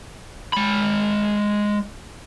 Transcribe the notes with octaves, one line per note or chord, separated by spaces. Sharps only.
G#3 B5